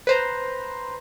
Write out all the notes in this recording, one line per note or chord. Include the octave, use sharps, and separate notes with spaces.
B4 C5 A#5